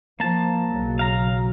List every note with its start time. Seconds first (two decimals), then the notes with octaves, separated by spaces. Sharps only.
0.20 F3 A#3 A5
0.69 B1 C#3 F#3
0.99 F5 A#5